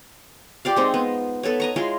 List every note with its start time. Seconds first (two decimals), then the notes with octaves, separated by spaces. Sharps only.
0.65 F4 G4 D5 F5
0.76 G#3 C4 D#4
0.94 B3
1.43 B3 A4 B4 C#5
1.60 D#5 A#5 C#6
1.76 G#3 E4 F4 C#5